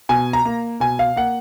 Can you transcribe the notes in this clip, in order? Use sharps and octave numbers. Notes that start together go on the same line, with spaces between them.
B2 G#5
A#5
A#3
B2 G#5
F5
A#3 F#5